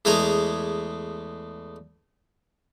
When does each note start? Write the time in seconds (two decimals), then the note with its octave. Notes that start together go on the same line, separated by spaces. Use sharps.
0.05 E2 G#3 A3 G#5 A#5